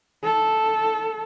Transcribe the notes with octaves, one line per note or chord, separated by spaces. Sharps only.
A4